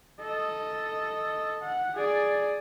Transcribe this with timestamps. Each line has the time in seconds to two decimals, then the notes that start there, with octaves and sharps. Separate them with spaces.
0.21 A4 D#5
1.61 F#5
1.94 G#4 D5